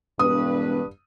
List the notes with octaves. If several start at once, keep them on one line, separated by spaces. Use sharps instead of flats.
E1 G2 B4 D#6